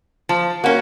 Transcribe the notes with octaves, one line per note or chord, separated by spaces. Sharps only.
F3 A5
A#3 C#4 F#4 A#4